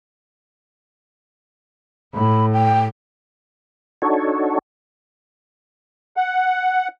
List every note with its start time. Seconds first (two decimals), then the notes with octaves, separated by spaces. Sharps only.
2.14 A2 B5
2.53 G5
4.02 D4 D#4 F#4 A4 C#5
6.17 F#5